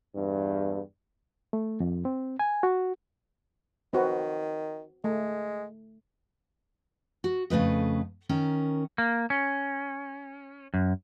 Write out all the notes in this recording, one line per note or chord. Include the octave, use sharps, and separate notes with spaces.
E2 G2
A3
F2
C4
G#5
F#4
D#3 C4 F#4 B4
G#3 A3
F#4
F2 C#3 A3 B4 D#5
D#3 C#4 A#4
A#3
C#4
F#2